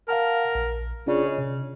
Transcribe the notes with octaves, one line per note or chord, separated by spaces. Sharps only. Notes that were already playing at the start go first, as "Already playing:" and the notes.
A#4 F5 F#5 A5
A#1
C#3 D4 F4 D5
C#5 D#5
C3